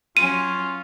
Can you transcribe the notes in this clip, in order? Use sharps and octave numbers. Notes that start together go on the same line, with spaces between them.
F#3 C#4 F4 D#7